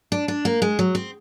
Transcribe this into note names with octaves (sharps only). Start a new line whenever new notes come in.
D4
D4
A#3
G#3
F#3
C4